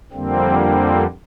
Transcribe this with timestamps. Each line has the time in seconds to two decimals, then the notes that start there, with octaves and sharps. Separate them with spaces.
0.12 F2 D3 G3 A#3 C4
0.59 C4